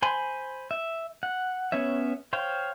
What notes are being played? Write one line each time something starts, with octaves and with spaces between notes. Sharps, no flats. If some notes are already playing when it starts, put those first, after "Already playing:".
C5 G#5 B5 C6
E5
F#5
B3 C#4 C#5 E5
C5 C#5 F5 G5